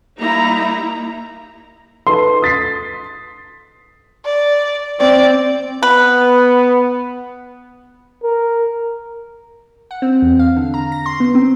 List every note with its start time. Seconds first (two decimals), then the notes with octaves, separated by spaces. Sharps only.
0.18 G3 A#3 D#4 E4 A#5
2.07 D#4 A4 B4 C6
2.42 D#6 A6 B6 C7
4.25 D5
5.00 C4 D5
5.83 B3 B4
8.23 A#4
9.91 F#5
10.02 C4
10.22 E2
10.39 F5
10.57 D3
10.74 A#5
10.92 A#6
11.06 C6
11.20 B3
11.35 C4